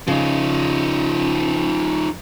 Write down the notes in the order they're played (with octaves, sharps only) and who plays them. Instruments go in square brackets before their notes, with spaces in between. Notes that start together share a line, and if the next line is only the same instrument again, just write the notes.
[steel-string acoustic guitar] C#3 [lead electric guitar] F3 D#4